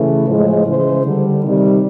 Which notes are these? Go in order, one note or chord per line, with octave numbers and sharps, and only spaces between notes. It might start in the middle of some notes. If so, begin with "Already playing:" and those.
Already playing: C#3 E3 A3
A2 F3 G#3
C#3 E3 G#3 C5
D3 G3
C3 D#3 G3